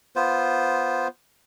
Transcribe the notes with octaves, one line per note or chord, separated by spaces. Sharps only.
B3 F4 C5